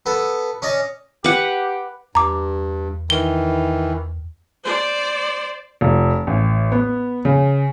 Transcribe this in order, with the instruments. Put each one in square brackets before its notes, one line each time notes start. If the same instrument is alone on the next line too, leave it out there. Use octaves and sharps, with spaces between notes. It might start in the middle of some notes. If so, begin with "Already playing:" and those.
[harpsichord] B3 A4
C#4 D5 D#5
[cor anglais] G4 [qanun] B4 F#5
[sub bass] E2 [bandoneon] G2 [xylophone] A#5 D6
[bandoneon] D#3 E3 [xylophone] G7
[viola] C5 D5
[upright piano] F1
A1
B3
C#3